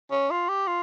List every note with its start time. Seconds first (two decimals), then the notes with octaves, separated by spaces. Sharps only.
0.12 C#4
0.31 F4
0.49 G4
0.67 F4